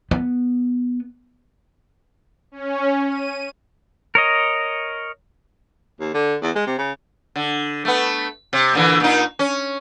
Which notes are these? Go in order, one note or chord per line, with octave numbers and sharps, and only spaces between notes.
B3
C#4
D#7
A#4 C#5 D#5
D#2
D3
E2
G#3
C3
C#3
D3
A3 B3
C3
A#2 D3 E3
A#2 D#4
C#4